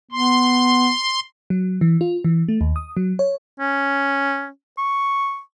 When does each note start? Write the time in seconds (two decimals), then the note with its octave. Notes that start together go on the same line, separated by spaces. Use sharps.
0.12 B3 C6
1.50 F#3
1.81 E3
2.01 F4
2.24 E3
2.48 A3
2.61 D#2
2.76 D#6
2.97 F#3
3.19 C#5
3.60 C#4
4.78 C#6